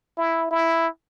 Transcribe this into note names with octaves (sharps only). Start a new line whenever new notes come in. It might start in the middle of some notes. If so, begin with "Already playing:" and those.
E4
E4